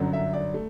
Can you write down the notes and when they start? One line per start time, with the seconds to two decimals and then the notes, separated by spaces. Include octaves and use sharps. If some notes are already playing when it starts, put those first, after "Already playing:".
Already playing: G1 F#2 D3 F#3
0.13 E5
0.33 D5
0.54 A3